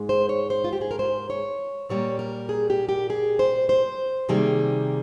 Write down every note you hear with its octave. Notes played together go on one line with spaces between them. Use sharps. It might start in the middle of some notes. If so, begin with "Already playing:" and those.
Already playing: G#2 G#3
C5
C#5
C5
F4
G4
G#4
A#4
C5
C#5
A#2 G3 A#3 C#5
A#4
G#4
G4
G4
G#4
C5
C5
C3 D#3 G3 A#3 G#4